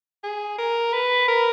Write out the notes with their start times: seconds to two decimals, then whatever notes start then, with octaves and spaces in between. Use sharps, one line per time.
0.24 G#4
0.58 A#4
0.93 B4
1.28 A#4